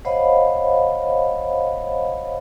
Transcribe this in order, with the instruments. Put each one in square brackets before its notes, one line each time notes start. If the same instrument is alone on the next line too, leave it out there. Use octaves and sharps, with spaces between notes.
[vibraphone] C5 C#5 D#5 F5 F#5 B5